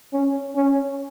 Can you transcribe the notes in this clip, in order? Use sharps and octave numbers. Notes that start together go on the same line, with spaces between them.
C#4
C#4